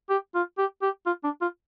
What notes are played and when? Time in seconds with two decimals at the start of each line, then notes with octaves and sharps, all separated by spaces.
0.10 G4
0.34 F4
0.58 G4
0.82 G4
1.06 F4
1.24 D4
1.41 F4